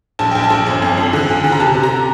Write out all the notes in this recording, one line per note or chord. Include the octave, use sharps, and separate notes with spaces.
A#1 A5
A#1 G5
A5
A#1
G1
F2
F2
D3
D2
D3
A#5
C3 A5
C3
A#5